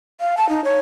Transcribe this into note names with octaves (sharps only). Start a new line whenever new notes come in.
F5
A5
D#4
C#5